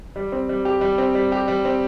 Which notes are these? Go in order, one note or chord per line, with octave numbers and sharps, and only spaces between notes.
G3
C4
G3
G4
G3
C4
G3
G4
G3
C4